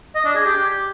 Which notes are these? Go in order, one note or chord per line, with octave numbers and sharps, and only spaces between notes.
D#5
D4
G#4
G4